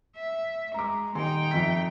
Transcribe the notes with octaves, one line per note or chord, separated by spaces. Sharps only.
E5
G#3 A#5 D6
D#1 D#4 G5 G#5 C6
F2 E5 B6